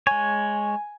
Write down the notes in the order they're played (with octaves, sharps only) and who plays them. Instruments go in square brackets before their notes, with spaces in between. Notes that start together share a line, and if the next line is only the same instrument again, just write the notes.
[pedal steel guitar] G#3 C#5 [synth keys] G#5